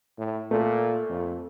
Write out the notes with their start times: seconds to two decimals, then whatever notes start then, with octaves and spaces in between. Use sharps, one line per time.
0.18 A2
0.51 A#2 A3
1.10 F2